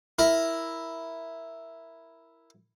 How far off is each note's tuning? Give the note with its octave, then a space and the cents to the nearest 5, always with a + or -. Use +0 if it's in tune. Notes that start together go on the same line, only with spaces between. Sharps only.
E4 +0 A#4 +0